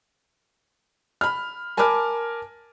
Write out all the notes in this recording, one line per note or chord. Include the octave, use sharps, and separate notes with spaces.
B5 F6
A#4 G#5 A5 B5 D6 F6